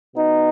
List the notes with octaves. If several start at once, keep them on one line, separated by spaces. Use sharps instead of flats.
B2 B3 D#4